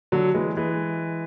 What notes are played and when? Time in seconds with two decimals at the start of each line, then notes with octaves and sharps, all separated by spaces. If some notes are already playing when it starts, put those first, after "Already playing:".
0.12 D3 F#3
0.35 E3 G#3
0.57 E3 G#3